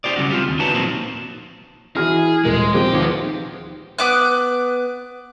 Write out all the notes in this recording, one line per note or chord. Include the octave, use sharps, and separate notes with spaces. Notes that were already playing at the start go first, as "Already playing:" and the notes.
D#4 E4 G4 C5 D5
C#3 G3 C#4 F#4
C4 F4 G4
D#2
D#4 F#4 B4 C#5 A5
A#2 F3 F#3 A#3 C4
E3 F#4 G#4 F6
D#1 G#3 A#4
F3 C4 G4 G#4
D#2 F3 B3
B3 D6 F#6